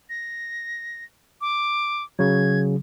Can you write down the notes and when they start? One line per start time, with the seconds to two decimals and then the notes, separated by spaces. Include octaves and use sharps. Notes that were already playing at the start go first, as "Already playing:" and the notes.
0.09 A#6
1.41 D6
2.19 C#3 F#3 G#6